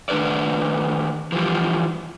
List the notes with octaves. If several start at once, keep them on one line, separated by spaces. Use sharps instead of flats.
D#3 A3 D4 B4 D5
E3 F3 G3